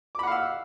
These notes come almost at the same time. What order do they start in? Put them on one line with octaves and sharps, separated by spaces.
D6 B5 F#5 F5 E6